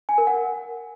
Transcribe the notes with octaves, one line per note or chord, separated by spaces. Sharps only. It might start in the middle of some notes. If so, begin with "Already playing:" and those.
G#5
A#4
F#5